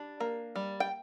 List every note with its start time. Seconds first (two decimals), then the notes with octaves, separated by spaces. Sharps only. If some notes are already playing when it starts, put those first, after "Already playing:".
Already playing: G3 D4
0.20 A#3
0.55 G3
0.80 G5